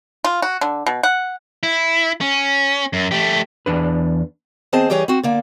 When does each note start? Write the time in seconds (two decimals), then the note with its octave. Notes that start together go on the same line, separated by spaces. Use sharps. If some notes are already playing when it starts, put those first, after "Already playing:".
0.24 F4
0.42 F#4
0.61 D3
0.87 B2
1.03 F#5
1.63 E4
2.21 C#4
2.93 F#2
3.12 A3 G4
3.66 E2 D4 B4
4.73 E2 C4 G#4 C5 D#5 A5
4.90 E3 G3 G4 G#4 C#5 D#5
5.08 C4 F#4
5.23 D3 A#3 D5